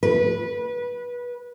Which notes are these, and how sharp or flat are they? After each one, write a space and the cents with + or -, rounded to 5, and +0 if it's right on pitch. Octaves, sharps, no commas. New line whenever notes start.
B4 -20